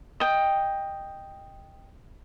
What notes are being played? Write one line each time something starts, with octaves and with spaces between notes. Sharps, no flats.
D#5 G5